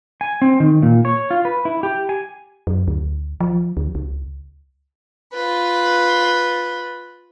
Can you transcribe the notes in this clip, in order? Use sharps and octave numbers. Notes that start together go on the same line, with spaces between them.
G#5
C4
D#3
A#2
C#5
F4
B4
E4
G4
G#5
F#2
D2
F3
D2
C#2
F4 B4